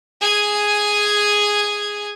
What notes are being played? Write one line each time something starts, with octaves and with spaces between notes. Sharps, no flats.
G#4 G#5